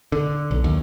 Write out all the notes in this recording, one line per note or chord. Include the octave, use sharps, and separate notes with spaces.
D3
B1
D#2